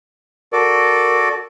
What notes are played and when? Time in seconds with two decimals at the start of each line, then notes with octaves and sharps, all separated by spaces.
0.52 F#4 A4 A#4 D5